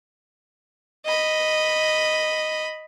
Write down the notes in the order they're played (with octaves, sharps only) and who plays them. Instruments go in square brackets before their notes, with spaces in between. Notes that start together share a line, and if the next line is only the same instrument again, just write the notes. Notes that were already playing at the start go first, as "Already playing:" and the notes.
[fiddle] D#5 B5